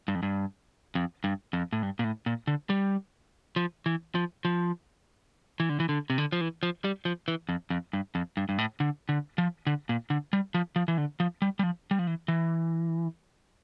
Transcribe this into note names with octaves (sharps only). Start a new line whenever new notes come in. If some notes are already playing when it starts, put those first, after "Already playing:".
G2
F2
G2
F2
G2
F2
A2
G2
A#2
A2
A#2
D3
G3
F3
E3
F3
F3
E3
D3
E3
D3
C3
D3
F3
E3
F3
G3
F3
E3
F2
F2
G2
F2
G2
G2
A2
D3
D3
F3
D3
A#2
D3
G3
F3
F3
E3
D3
F3
G3
G3
F3
G3
F3
E3
E3